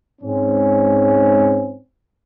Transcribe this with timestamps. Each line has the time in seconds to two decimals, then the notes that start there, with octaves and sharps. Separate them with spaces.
0.22 G#2 C4 C#4